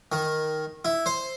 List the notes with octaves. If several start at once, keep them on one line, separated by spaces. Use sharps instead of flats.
D#3
E4
C5